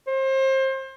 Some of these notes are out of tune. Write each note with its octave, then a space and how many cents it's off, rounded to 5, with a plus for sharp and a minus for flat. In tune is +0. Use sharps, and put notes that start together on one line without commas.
C5 +30